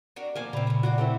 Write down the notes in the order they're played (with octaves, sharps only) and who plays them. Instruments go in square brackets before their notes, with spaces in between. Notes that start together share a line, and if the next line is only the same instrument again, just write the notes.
[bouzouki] D4 F#4 A#4
[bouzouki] B2 F3 [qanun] A#3 G#5 D6
[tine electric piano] A#2 C#3 B5 [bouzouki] C4 E4 [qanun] A#5
[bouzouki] A3 C#4
[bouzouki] F#3 A#3 D5 [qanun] F#4
[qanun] A3 C4 E4 [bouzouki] G4